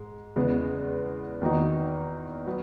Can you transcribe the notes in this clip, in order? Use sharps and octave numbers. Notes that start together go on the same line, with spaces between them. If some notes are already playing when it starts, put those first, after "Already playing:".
Already playing: G#2 G#3
E2 C#3 G#3 B3
E2 D#3 A#3 D#4 F#4
F#3 B3